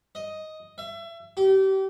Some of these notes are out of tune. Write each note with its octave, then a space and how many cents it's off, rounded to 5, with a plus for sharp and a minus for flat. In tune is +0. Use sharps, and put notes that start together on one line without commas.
D#5 +5
E5 +30
G4 -30